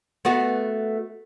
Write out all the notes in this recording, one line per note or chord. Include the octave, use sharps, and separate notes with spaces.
A3 B3 F#4